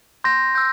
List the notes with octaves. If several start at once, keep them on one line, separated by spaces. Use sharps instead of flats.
C6 G6 A#6
E6 G6